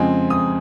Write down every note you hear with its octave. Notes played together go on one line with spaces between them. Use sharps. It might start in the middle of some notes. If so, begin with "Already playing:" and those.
Already playing: F2 C#3 G#3 C4 G#5
D#6